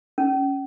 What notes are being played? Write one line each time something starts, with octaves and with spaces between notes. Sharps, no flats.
C#4